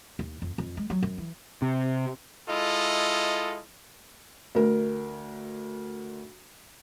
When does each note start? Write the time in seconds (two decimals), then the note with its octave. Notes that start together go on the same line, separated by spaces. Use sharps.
0.19 D#2
0.42 F2
0.58 F2
0.77 G#3
0.90 F#3
1.03 F#2
1.18 E3
1.62 C3
2.48 G#3 E4 F4 A4 D#5
4.55 D2 A#4